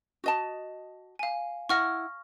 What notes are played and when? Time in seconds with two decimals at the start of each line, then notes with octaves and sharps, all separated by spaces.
0.24 F#4 D#5 A5
1.19 F5 G#5
1.69 E4 F#5 C#6 F6 A#6